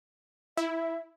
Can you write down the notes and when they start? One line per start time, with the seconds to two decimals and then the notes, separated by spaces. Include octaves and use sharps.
0.57 E4 E5